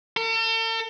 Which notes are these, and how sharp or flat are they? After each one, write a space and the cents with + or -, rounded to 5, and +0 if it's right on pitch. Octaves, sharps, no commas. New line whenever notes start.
A4 +45